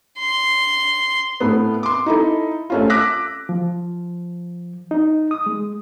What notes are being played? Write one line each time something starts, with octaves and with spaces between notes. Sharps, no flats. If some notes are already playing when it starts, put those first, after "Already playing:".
C6
A2 A3 B3
C6 D6
D#4 E4 A4
A3 C#4 F4
D6 E6 F#6 A#6 B6
F3
D#4
D#6
G#3